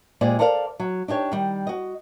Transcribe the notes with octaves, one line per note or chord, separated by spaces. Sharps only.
A#2 G#3 G4 C5 D5
A4 A#4 C5 D5 D#5 F5
F#3
D4 D#4 G4 C#5
D#3 G3
F#4 D#5